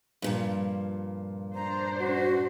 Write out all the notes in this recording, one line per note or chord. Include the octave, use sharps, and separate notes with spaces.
G2 A#2 F3
D4 C5 A#5
F#4